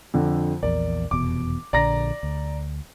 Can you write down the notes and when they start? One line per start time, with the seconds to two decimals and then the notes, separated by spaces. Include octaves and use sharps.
0.14 F2 D3
0.63 A#1 E2 A#4 D5
1.11 F1 E2 B2 D6
1.73 A#1 D3 D5 A#5 A#6
2.23 D2